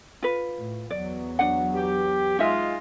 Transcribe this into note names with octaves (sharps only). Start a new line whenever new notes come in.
F4 B4
A2
E2 F#3 B3 D5
D4 F#5
G4
G#3 D#4 F4 E5